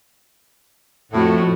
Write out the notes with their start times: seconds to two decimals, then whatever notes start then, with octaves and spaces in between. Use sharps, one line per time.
1.12 F2 A2 A3 F#4